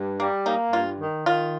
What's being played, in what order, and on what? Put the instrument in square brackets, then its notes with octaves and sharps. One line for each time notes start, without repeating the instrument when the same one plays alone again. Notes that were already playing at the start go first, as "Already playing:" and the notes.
Already playing: [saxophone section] G2
[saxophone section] G3 [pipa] A#3
[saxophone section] A#3 [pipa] D#4
[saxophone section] G2 [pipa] F4
[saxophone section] D#3
[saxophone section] D#3 [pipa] F4